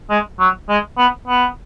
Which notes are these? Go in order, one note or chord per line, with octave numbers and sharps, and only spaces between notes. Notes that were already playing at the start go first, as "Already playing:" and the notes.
G#3
F#3
G#3
B3
B3